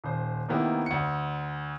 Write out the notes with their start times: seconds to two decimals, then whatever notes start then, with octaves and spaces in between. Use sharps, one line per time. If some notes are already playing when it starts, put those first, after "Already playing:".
0.04 D#1 C5
0.49 C3 D#3 A#3 B3 E4
0.86 D2 C#7